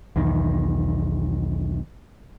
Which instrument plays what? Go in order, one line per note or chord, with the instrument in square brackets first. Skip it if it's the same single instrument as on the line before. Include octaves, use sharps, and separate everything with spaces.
[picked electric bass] B1 E2 D#3